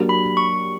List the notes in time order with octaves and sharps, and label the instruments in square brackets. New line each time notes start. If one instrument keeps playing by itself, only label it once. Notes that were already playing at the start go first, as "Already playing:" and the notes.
Already playing: [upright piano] F#3 A#3 D4 G4 A#4
[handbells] B5
C#6